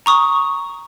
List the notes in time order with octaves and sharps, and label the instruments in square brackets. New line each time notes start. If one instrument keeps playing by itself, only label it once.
[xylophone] A#5 C#6 D#6